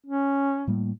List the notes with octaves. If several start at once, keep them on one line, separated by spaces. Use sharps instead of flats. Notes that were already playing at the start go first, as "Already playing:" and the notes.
C#4
A2 G3 A#3